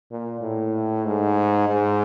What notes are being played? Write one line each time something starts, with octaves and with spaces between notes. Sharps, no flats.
A#2
A2
G#2
G#2